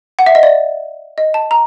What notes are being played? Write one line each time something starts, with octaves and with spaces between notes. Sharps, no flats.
F#5
E5
D#5
D5
D#5
A5
A#5